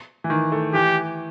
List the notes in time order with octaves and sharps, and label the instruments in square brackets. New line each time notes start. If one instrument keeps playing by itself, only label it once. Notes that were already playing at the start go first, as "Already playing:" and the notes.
[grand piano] E3
D#3
A3
[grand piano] E3 [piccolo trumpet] G4